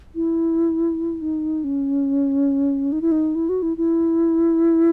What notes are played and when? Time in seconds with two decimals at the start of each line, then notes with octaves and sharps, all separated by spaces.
0.15 E4
1.22 D#4
1.64 C#4
2.92 D#4
3.02 E4
3.12 D#4
3.35 E4
3.49 F#4
3.62 E4
3.77 E4